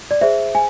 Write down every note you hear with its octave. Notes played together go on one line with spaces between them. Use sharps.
D5
G#4 C5 E5
G#5